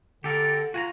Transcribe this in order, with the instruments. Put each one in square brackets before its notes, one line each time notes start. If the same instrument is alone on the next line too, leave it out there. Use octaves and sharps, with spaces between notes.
[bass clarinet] D3 [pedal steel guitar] G4 A4 A#4
[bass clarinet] F4 [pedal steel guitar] F#4 G#5 A#5